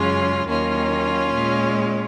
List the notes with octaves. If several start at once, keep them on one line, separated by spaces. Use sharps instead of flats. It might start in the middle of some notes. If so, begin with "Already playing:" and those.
Already playing: F#2 C#3 G#3 C#4 F4
D#2 D#3 F#3 A#3 C#4 F4
A#2 G#3